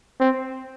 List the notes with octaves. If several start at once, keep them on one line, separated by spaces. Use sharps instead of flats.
C4